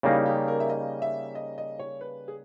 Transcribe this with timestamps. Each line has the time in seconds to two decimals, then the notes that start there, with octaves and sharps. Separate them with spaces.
0.03 C#3 G3 A#3 D#4 E4
0.26 G4
0.48 A#4
0.60 E5
0.69 D#5
1.02 E5
1.35 D#5
1.58 D#5
1.79 C#5
2.01 B4
2.28 G#4